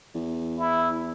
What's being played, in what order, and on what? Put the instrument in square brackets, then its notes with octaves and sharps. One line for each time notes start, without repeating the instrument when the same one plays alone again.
[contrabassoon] E2
[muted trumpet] E4